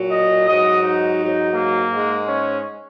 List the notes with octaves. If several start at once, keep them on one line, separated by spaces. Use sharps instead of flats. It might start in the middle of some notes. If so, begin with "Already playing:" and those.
Already playing: A#2 F#3
D#5
G#2 F#3 D#5
D#4
G#2 F#3
A#3
G#2 G#3
C#4